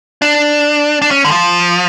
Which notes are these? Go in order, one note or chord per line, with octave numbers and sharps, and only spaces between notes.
D4
D4
C#4
D3
F3